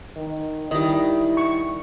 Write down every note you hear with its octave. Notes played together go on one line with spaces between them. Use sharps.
D#3
D#3 G3 E4 D#5
C#6